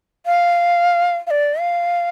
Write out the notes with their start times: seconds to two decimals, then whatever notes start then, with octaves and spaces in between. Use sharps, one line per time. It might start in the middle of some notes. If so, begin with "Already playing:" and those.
0.26 F5
1.27 F5
1.31 D5
1.59 F5